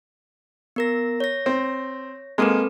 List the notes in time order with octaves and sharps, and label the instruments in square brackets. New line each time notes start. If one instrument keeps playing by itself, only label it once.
[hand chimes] B3 A#4 A#6
C#5 A#6
[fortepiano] C4
[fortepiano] G#3 A#3 [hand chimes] C4 A4 B4